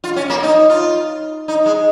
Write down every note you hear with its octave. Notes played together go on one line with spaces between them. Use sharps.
F4
C#4
A#3
D#4
F4
D#4
G#3